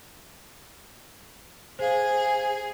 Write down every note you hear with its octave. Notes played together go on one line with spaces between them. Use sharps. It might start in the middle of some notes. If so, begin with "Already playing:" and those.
G#4 C5 F5